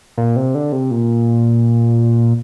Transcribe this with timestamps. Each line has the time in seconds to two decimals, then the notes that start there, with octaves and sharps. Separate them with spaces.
0.18 A#2
0.36 C3
0.55 D3
0.72 C3
0.91 A#2